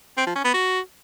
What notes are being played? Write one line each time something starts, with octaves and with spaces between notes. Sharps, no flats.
C4
F3
C#4
B3
F#4